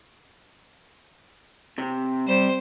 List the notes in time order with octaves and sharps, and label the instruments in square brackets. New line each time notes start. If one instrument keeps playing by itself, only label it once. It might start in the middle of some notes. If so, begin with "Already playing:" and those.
[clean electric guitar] C3 [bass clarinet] C4
[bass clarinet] G3 [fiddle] C5